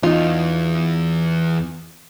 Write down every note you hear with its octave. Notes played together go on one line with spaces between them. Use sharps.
E2 D#4 F4